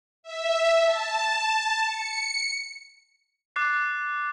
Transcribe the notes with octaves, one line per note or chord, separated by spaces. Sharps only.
E5
A5
C#7
D6 F#6 A6 C7